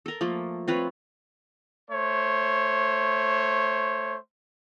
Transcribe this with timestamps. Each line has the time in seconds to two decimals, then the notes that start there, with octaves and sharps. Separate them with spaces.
0.06 A4 A#4
0.21 F3 A3 A#3
0.68 C4 F4 B4 C#5
1.91 A3 C5 C#5